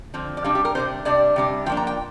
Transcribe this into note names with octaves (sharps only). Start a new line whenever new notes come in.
D3 F3 C4
D5
C3 G3 D4 F5
G4
A#4
C3 G3 D4 C5
C3 G3 D4 D5
C3 G3 D4
F3 A#3 D4 G5
A#5
G5